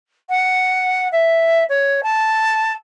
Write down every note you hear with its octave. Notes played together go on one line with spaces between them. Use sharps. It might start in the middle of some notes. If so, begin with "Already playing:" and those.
F#5
E5
C#5
A5